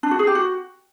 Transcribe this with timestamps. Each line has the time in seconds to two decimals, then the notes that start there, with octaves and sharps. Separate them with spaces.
0.03 D4
0.11 F#4
0.19 G#4
0.27 G4
0.35 F#4